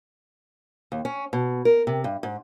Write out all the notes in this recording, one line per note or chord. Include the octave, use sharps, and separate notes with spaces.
D#2
C#4
B2
A#4
C3
G2
G#2